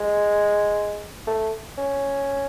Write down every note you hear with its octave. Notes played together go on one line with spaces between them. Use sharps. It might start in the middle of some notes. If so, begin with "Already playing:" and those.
Already playing: G#3
A3
C#4